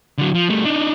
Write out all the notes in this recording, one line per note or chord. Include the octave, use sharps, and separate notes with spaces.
D3 F#3
F3
G3 A3
D4 D#4